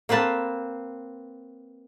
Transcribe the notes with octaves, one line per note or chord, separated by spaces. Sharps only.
A#3 C4 B4 A5